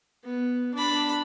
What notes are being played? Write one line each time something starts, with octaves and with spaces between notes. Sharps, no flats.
B3
D4 B5